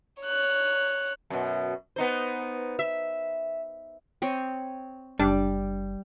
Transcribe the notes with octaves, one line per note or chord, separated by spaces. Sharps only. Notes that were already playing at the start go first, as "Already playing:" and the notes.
C#5 F#6
F#2 B2
B3 D#4 C5
E5
C4 C#5 D#5
F#1 G3 D4 D6